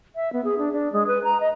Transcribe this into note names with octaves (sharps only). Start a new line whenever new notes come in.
E5
B3
G#4
D4
D4
G#3
B4
A#5
D#5